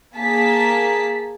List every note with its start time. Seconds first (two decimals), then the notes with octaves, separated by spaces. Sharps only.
0.15 A#3 G#4 A5 B6